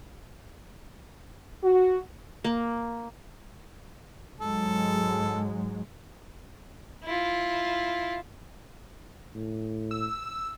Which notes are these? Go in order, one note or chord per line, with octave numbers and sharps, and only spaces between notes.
F#4
A#3
G#2 F#3 G#3 A4
E4 F4
A2
E6